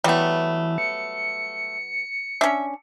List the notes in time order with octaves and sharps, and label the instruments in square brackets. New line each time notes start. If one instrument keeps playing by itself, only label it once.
[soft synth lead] E3 [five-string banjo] F#3 B3 [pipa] G3 A3
[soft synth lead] C#7
[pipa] C#4 D4 [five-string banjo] E5